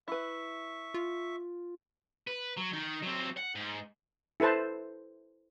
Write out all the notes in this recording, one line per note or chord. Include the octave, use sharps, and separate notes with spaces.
E4 B4 E5 C#6
F4
B4
F#3
D#3 D#4
F#3 C4
F#5
G#2
E4 A4 B4 C5 A5